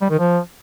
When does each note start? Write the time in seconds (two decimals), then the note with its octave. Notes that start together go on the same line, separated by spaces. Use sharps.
0.02 G3
0.10 D#3
0.19 F3